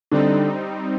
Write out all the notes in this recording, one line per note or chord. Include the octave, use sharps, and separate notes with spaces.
D3 G3 C4 D4 D#4